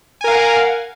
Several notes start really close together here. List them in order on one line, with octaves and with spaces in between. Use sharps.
G#5 A#4 F5 F#5